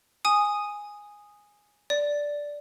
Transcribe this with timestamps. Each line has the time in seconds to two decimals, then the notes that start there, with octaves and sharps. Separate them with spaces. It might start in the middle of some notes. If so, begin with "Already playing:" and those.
0.25 G#5 D#6
1.90 D5